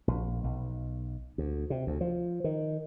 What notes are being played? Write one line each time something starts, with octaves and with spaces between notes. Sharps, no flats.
A#1
B1
D2
C3
D2
F3
D#3